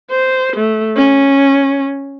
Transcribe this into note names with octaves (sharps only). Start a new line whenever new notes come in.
C5
A3
C#4